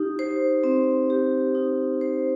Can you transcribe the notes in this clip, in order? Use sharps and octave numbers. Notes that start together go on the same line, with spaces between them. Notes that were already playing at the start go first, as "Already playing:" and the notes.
Already playing: D#4 G4
C5
C4
G4
D#4
C5